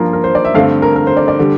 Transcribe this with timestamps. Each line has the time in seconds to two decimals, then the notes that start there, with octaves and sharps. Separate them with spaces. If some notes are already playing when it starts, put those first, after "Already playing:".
Already playing: G2 F3 A#3 F4 A#4
0.13 A#4
0.24 C5
0.35 D5
0.45 E5
0.55 G2 D3 A3 C4 F5
0.82 A#4
0.96 A#4
1.07 C5
1.17 D5
1.28 D5
1.39 D3 G3